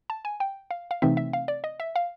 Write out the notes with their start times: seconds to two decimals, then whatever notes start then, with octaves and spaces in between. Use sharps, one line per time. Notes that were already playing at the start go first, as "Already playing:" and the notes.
0.10 A5
0.25 G#5
0.40 G5
0.71 F5
0.91 F5
1.02 C3 E3 A3 C4 D#4 E5
1.17 E5
1.33 F5
1.48 D5
1.64 D#5
1.80 E5
1.96 F5